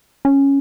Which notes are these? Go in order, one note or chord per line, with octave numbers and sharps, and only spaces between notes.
C#4